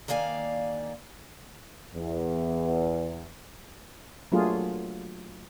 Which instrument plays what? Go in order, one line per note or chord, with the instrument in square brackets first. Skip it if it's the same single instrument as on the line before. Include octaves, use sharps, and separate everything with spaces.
[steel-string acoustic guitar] D#3 A#3 D5 F5 G#5
[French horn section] E2
[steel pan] F#3 A3 A#3 D4 F4 G#4